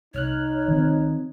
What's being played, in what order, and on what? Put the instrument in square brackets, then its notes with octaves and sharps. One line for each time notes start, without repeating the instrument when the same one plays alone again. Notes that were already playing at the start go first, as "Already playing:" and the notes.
[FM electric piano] C2 F6 F#6 [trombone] D#4 [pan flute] C#5
[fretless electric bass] D#3 C4